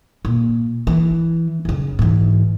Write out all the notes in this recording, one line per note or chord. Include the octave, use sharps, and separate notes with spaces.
A#2
E3
F#2 C#3
G#2 E3